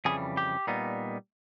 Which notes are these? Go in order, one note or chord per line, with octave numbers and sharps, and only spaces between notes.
F2 C#3 E3 G3 G#4
G4
A#2 G3 B3 D#4